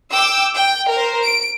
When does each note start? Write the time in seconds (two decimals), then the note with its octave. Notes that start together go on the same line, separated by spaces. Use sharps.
0.13 G5 D6 E6
0.56 G5
0.92 A#4 C5
1.23 D7